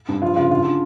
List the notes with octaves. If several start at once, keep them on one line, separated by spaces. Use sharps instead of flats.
G2
F3 F4
C#3 F4
D3 F4
D3